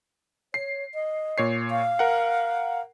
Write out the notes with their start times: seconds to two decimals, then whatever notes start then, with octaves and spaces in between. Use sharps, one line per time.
0.54 C#5 C7
0.94 D#5
1.38 A#2 C#5 C7
1.71 F5
1.99 A#4 F#5